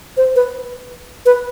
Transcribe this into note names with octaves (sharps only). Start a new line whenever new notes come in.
C5
B4
B4